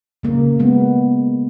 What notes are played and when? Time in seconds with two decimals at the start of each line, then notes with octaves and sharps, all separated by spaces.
0.23 C#3 A#3
0.59 G#3 B3